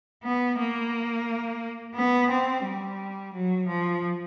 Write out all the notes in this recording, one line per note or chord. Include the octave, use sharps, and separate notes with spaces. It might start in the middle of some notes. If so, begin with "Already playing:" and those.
B3
A#3
B3
C4
G3
F#3
F3